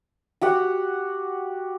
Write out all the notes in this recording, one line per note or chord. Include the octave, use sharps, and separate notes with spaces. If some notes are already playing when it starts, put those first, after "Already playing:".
F#4 G4 F#5